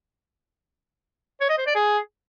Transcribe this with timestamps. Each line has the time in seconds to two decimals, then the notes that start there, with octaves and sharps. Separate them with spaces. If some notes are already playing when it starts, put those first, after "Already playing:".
1.41 C#5
1.50 D#5
1.58 C5
1.67 D5
1.75 G#4